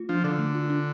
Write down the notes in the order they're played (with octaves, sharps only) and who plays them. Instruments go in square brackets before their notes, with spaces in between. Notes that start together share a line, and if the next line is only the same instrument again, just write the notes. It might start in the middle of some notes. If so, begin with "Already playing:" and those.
Already playing: [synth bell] A3 F4
[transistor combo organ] F3 [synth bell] D4
[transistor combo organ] D3 [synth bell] A4
[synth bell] A3
F4
D4